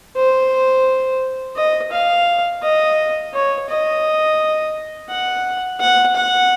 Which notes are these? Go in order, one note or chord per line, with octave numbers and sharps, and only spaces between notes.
C5
D#5
F5
D#5
C#5
D#5
F#5
F#5
F#5